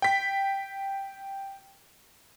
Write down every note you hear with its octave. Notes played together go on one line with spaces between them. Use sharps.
G5 B6